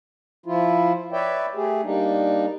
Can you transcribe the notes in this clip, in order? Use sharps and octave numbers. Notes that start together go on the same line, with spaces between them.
F3 E4 F4
B4 C#5 D5 E5 G5
A3 G4 G#4
G3 A#3 D4 D#4